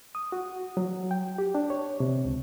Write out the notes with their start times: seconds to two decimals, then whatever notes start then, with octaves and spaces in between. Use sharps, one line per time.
0.15 D#6
0.32 F#4
0.77 F#3
1.11 G5
1.38 G4
1.55 D4
1.70 C#5
2.00 C3
2.25 C#2